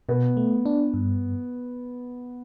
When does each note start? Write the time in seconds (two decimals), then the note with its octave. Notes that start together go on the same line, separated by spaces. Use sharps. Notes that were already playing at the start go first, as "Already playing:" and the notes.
0.09 B2 B3
0.37 A3
0.66 D4
0.94 G2